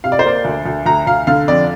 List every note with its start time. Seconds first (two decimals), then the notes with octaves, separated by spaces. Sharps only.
0.04 C3 F5
0.12 D5
0.19 C5
0.25 A#3 D5
0.45 D2
0.66 D2
0.86 D2 A#5
1.07 D2 F5
1.27 D3 F5
1.48 F2 D5